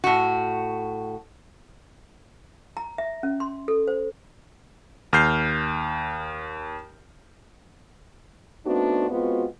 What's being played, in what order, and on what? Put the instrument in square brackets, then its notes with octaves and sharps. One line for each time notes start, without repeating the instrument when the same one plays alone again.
[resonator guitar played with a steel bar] A2 F#4
[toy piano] A#5
E5
C#4
C6
A4
C5
[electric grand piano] D#2 F6 G6 C7
[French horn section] A3 B3 C4 D4 D#4 F#4
G#3 B3 C4 F4 F#4